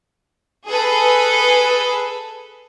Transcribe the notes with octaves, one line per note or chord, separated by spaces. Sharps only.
G#4 A4 B4